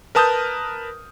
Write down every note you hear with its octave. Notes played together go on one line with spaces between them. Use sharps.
A#4 B4 A5 D#6 F6 G6